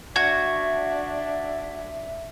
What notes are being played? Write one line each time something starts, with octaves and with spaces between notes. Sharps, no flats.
D4 F#4 E5 G#6